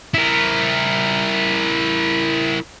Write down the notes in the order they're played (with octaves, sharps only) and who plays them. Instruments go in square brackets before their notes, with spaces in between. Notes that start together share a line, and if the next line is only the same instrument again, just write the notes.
[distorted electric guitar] E4 A#4